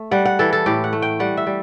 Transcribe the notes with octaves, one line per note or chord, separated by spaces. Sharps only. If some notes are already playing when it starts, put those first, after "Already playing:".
Already playing: A3
G3 F#5
F#5
E3 A4
A4
A2 G4
F#5
A3
G5
G3 F#5
E5
G3